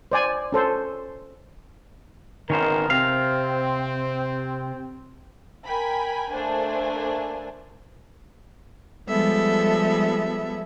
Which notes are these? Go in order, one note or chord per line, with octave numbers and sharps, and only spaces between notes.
C5 D5 G#5
C#4 A4 C5
G#1 D#3 B3 C#4 A#4 C5
C3 C4 F5
A#4 G5 G#5 B5
A3 A#3 D4 C5 G#5
F3 G3 G#3 B3 A4 E5